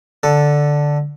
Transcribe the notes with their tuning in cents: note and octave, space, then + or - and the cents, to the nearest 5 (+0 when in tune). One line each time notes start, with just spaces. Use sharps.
D3 +0 A4 +0